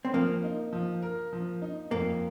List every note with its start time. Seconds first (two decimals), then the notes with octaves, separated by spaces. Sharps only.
0.05 C4
0.14 F3 A#3
0.44 D#4
0.73 F3
1.02 A#4
1.33 F3
1.62 D#4
1.91 F2 A#3